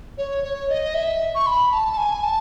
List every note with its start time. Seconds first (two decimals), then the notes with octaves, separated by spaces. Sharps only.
0.18 C#5
0.44 C#5
0.69 D#5
0.95 E5
1.35 C#6
1.47 B5
1.72 A5
1.93 A5
1.97 G#5
2.23 A5